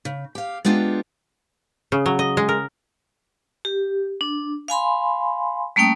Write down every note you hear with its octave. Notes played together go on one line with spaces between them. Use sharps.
C#3
G4 F5
G#3 B3 D4 F4 G4
C#3
F#3
D#5
G#3
A#4
G4
D4
F5 G#5 B5 C6
G3 A3 A#3 C#4 G5 D#6